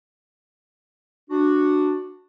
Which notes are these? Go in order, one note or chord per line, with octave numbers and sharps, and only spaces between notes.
D4 F#4